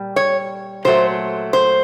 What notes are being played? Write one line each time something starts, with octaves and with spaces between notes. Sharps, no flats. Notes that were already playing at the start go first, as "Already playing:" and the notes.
Already playing: A#2 G3
C#5
A#2 F#3 A3 C5
C5